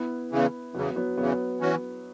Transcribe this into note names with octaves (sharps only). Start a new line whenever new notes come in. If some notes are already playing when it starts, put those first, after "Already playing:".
Already playing: B3 E4
E2 C#3 E3
E2 C#3 E3 F#3 B3
F#3 B3
E2 C#3 E3 F#3 B3
E3 C#4 F#4